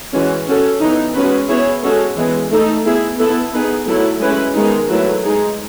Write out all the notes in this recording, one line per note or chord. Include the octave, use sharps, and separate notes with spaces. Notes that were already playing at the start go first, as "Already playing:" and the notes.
E3 G#3 C#4 F#4
C#4 F#4 A4
E3 B3 D#4
G#3 C#4 F#4 B4
B3 E4 G#4 C#5
G#3 C#4 F#4 A4
E3 G#3 B3
A3 D#4 A4
B3 E4 G#4
B3 E4 A4
B3 D#4 G#4 B4
F#3 A3 E4 A4
G#3 C#4 E4 B4
D#3 G#3 B3 D#4
F#3 A3 E4 B4
G#3 D#4 G#4